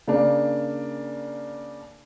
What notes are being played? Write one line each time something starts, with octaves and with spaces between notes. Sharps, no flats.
C#3 A#3 D4